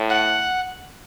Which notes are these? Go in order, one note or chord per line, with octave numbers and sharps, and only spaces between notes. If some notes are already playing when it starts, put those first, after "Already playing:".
Already playing: A2
F#5